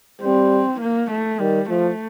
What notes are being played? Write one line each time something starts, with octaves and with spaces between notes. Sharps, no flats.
G3 C4
A#3
A3
D#3 G3
F3 A3